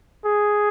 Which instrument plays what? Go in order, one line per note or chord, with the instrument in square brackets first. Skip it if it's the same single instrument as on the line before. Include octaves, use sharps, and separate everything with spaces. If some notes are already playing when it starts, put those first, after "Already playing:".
[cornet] G#4